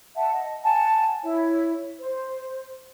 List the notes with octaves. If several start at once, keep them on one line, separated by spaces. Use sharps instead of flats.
E5 F#5 A5
D#5
F#5 G#5 A5
E4 C#5
C5